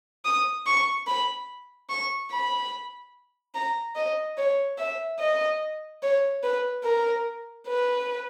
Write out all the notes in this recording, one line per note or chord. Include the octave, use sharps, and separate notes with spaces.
D#6
C#6
B5
C#6
B5
A#5
D#5
C#5
E5
D#5
C#5
B4
A#4
B4